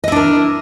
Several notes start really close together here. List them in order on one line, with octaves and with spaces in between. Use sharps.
D#5 E4 D4 A#4